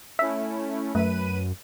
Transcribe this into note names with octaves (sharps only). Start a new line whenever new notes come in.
A3 C#4 E4 E5 E6
F#2 A3 B4 E5 D#7